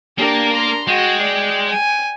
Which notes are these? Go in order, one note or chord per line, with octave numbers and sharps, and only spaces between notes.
A#3 D4 G4 A#4
A#5 C6
G#3 F#4 G5
D5
G#5